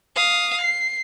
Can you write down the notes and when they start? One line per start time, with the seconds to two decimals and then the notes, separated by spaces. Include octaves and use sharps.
0.16 F5 D#6
0.62 C7